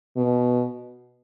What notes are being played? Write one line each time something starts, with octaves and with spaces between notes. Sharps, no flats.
B2